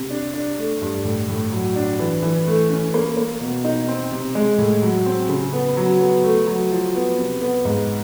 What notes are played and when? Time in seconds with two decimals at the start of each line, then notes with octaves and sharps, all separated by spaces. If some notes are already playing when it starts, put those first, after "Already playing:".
Already playing: C3
0.10 D4
0.34 D4
0.58 A3
0.82 G2
1.05 A2
1.29 A2
1.52 F#3
1.76 D4
1.99 E3
2.23 E3
2.47 A3
2.70 C#4
2.94 A#3
3.17 A#3
3.41 B2
3.64 D#4
3.88 C4
4.12 C3
4.35 G#3
4.58 A2
4.82 F#3
5.06 C4
5.29 C#3
5.53 B3
5.77 F#3
6.01 B3
6.24 A3
6.47 F#3
6.71 F3
6.95 B3
7.18 C3
7.41 B3
7.65 G#2